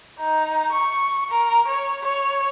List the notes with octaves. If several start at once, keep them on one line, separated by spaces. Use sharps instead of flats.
D#4
C#6
A#4
C#5
C#5